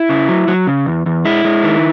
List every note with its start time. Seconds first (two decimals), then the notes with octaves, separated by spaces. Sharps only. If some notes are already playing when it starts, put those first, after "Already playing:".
Already playing: E4
0.09 C#3
0.28 F#3
0.48 F#3
0.67 C#3
0.86 E2
1.06 E2
1.25 G#3 E4
1.44 G#3
1.64 D#3